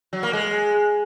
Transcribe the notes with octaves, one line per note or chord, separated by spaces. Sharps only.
F#3
A#3
G#3